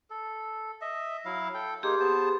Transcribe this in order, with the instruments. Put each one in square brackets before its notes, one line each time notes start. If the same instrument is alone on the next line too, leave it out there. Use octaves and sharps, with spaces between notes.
[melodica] A4
D#5 E5
F#3 E4 F5
A4 G5
[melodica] A#3 D#4 [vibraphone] G4 G#4 C6
[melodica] B3 C5 A5